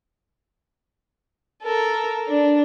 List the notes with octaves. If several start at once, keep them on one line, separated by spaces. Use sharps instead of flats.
A4 A#4
D4